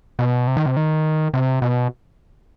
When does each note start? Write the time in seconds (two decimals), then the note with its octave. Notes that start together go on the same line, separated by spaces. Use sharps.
0.19 B2
0.47 C3
0.57 D#3
0.66 C3
0.77 D#3
1.34 C3
1.62 B2